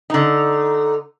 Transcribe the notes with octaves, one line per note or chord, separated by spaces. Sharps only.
D3 D#4